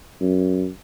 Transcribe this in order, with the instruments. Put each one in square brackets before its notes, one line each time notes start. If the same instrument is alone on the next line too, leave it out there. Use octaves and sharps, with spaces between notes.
[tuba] F#2